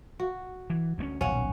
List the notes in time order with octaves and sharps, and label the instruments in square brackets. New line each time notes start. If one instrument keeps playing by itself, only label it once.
[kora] F#4
[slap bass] E3
D2 G3 C#4
[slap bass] D#1 B1 [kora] C#4 F#5